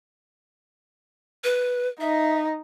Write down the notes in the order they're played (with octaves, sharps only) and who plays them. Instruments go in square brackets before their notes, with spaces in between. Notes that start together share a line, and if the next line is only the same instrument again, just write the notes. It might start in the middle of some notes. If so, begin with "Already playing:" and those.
[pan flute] B4
[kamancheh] D#4 D#5 [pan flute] E5